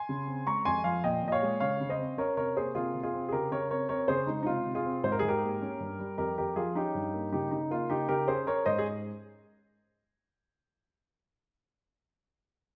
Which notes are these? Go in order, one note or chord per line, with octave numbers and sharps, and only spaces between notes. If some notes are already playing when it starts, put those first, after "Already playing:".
Already playing: G#5 C6
C#3
C4
G#3 A#5 C#6
F2 G#5 C6
F3 F5 G#5
A#2 D#5 G5
A#2 D#5
C#5 F5
G#3
C#3 C#5 F5
C#3
C5 D#5
C4
C#4 A#4 C#5
C3 A#4 C#5
A#3 G#4 C5
C3 F4 G#4
C3
F4 G#4
C4
G#4
C#3 G4 A#4
C#3 A#4 C#5
C4 A#4 C#5
C4 A#4 C#5
C#3 G#4 C5
G#3 D#4
D#4
C3 F4
C3
F4 G#4
C4
G#2 C5
A#4
G#4
G#2
G4 A#4
A#3
C#4
G2
G3
F2 G4 A#4
F2 G4 A#4
F3 F4 G#4
C#4 D#4 G4
G2
A#3
C#3 D#4 G4
C#3 D#4
A#3 F4
C#3 D#4 G4
C#3 G4 A#4
C#4 G#4 C5
C#4 A#4 C#5
G#2 C5 D#5
G#4